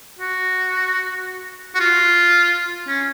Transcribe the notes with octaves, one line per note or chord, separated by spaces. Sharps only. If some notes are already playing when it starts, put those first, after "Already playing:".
F#4
F#4
F4
C#4